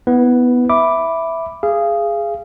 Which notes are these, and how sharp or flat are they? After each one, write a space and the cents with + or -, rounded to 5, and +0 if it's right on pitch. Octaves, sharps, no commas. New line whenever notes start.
B3 +0 E4 -30 B4 +0
E5 +0 B5 +0 D6 +0
G#4 -5 F5 -30